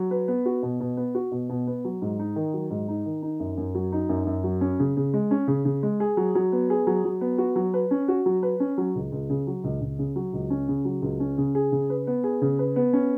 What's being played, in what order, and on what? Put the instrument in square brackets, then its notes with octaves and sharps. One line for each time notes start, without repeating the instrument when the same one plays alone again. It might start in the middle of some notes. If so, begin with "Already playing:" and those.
Already playing: [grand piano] F#3
B4
B3
F#4
B2
B2
B3
F#4
B2
B2
B3
F#3
G#2
D#4
D#3
F#3
G#2
D#4
D#3
D#4
F#2
F#2
F#3
D#4
F#2
F#2
F#3
C#4
C#3
C#3
G#3
C#4
C#3
C#3
G#3
G#4
F#3
F#3
B3
G#4
F#3
F#3
B3
F#4
F#3
B4
C#4
F#4
F#3
B4
C#4
F#3
C#2
C#2
C#3
F#3
C#2
C#2
C#3
F#3
C#2
C#4
C#3
F#3
C#2
C#4
C#3
G#4
C#3
B4
B3
G#4
C#3
B4
B3
C#4